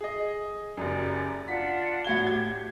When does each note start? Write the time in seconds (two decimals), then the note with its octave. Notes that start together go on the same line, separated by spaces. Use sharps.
0.01 G#4 D#5
0.77 F#1 F#2 G4 D5
1.48 D4 F4 F#5 B6
2.05 A2 F#4 G#6 G7
2.27 G4 G#6